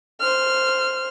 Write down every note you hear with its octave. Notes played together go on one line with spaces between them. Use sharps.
C5 F6